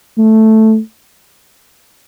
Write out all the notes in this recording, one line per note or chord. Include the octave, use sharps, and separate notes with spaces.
A3